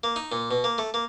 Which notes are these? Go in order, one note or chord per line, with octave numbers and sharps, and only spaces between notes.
A#3
D#4
A#2
B2
A#3
A3
A#3